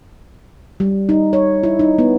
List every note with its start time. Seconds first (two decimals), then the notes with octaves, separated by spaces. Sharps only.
0.80 G3
1.09 D#4
1.33 C#5
1.63 E4
1.79 D#4
1.99 B3